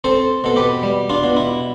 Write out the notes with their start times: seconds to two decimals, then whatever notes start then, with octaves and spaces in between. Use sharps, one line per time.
0.04 C4 A4 C5
0.44 B2 A4
0.56 G4 B4
0.83 G3
1.10 D4 F4
1.23 B2
1.36 E4